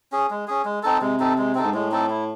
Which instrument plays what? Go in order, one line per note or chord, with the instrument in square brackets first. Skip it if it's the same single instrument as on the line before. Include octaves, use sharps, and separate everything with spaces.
[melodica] C#4 G#4
G#3
C#4 G#4
G#3
C4 D#4 A4
[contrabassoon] C3 [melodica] G#3
[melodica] C4 D#4 A4
G#3
C4 D#4 A4
[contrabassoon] G#2
[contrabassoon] A2 [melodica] G#3
[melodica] C4 D#4 A4
E4